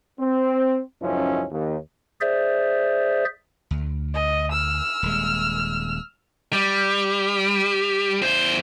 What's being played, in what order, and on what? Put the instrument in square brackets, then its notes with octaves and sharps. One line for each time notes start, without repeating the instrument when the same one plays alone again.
[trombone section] C4
C#2 F#2 F3 C#4 D#4 E4
D#2
[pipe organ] G#4 C5 D5 E5
[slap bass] D2
[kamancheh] D#5
E6 F6
[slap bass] D#1 G#3
[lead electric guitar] G3
E2 C5